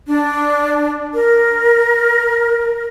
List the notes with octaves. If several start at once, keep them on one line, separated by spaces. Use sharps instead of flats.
D4
A#4